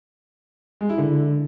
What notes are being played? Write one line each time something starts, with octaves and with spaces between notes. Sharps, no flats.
G#3
E4
D3